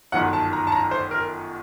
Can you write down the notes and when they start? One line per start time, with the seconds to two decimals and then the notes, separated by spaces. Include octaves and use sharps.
0.12 G1 F#2 D#3 F#3 F#5
0.33 A5
0.53 A#5
0.67 A5
0.72 A#5
0.91 C5
1.11 A#4